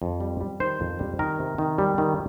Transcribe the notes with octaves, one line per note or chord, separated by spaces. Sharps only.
F2
G3
G3
D#3 C5
F2
G3
D#3 A#4
C3
D#3
G3
D#3